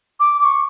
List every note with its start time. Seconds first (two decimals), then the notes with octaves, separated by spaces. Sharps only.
0.20 D6
0.40 D6
0.44 C#6